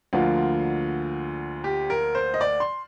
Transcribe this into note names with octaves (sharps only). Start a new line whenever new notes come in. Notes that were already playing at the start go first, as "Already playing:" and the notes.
D2 D3 F3 A#3 F4
G4
A#4
C5
D#5
D5
C6